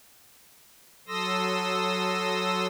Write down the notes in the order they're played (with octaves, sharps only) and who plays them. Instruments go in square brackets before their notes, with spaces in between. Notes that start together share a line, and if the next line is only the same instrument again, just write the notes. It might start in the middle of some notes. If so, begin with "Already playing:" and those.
[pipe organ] F#3 A4 C6 D#6 E6 A#6